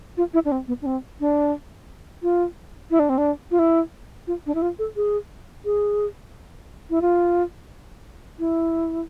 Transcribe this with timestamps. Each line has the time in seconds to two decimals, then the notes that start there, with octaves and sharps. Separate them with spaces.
0.17 F4
0.34 E4
0.45 D4
0.52 C4
0.68 B3
0.82 D4
0.86 C4
1.20 D4
2.23 F4
2.91 E4
2.99 D4
3.09 C4
3.18 D4
3.51 F4
3.59 E4
4.27 F4
4.46 D4
4.55 E4
4.62 F4
4.79 A4
4.96 G#4
5.65 G#4
6.90 E4
7.02 F4
8.39 E4